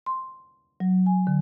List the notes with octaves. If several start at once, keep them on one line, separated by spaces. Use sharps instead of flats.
C6
F#3
G#5
D3